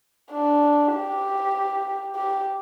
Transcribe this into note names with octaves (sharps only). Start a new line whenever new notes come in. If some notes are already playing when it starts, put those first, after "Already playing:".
D4
G4
G4